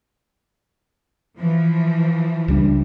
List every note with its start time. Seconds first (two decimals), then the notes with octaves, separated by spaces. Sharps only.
1.38 E3 F3
2.48 C#2 G3 D4